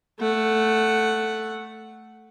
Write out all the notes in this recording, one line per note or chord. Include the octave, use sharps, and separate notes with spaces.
A3 F#5